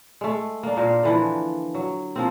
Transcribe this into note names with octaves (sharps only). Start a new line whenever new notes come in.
G#3 A3
A#3 D4
A#2 A#4 C5
D3 E3 F3
F#3
F3 A#3 C4